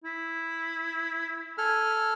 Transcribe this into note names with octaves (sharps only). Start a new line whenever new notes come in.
E4
A4 G#5 F6